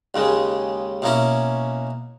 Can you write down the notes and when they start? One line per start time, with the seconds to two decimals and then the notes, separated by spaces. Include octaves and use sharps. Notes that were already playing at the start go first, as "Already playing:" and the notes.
0.14 D#2 C#3 G#3
1.02 B2 A#3 C#4 E4